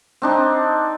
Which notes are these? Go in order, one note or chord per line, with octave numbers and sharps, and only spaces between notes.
C4 D4 D#4